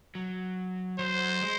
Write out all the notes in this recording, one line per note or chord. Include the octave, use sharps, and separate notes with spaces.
F#3
F#3 C5
G#3